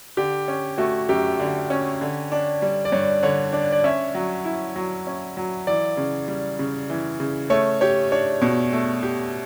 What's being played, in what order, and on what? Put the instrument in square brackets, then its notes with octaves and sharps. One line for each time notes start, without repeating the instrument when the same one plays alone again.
[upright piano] D3 [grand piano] G4
[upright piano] C#4
[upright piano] A3 [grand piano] F#4
[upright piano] F#2 [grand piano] G4
[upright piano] D3
C#4
D3
D4
G3
[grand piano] D5
[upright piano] G2 [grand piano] C#5
[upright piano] D3 [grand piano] C#5
[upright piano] D4 [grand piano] D5
[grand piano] D5
[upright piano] C#4 [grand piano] E5
[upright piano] F#3
E4
F#3
C#4
F#3
[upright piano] E3 [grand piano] D5
[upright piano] C#3
G3
C#3
E3
C#3
[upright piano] A3 [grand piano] C#5
[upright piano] G4 [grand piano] C#5
[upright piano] D4 [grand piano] C#5
[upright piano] B2
A3
G4